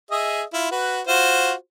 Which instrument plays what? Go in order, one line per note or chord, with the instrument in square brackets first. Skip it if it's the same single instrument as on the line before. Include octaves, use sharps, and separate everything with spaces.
[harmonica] G#4 D#5 E5
E4 F4
F#4 B4
F4 F#4 C5